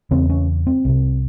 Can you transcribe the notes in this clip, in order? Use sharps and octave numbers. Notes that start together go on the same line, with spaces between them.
E2 C#3 C4
C#4
C4
C2 C3